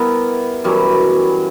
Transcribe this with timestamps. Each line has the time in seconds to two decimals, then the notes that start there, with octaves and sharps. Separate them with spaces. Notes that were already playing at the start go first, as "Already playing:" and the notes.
Already playing: G3 B3 E4 A#4
0.64 F#2 E3 G3 C#4